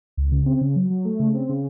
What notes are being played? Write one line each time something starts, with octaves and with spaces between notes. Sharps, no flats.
C#2
C#3
C4
C#3
F#3
F#3
A3
C#3
C4
C#3